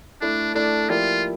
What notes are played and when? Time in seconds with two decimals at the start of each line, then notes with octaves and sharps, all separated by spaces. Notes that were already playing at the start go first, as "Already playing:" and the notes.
0.21 A3 D4 E4 A4 D5
0.55 A3 D4 E4 A4 D5
0.89 F3 A#3 E4 F4 G4 D5